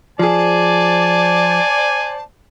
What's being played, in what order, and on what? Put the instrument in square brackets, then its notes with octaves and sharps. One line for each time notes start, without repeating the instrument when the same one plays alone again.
[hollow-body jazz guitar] F3 G#4 [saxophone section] C5 D5 [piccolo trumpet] G#5 [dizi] A5